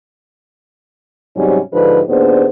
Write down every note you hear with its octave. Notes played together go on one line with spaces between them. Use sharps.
G#2 C3 F#3 G3 C#4
G#2 D3 F3 D4 G4 B4
D#2 A#2 B3 D4 G#4 C5